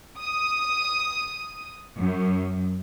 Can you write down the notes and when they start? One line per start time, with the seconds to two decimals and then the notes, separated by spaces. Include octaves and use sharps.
0.19 D#6
1.98 F#2